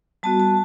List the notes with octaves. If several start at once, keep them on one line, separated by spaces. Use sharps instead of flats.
G3 B3 F#4 A5
A5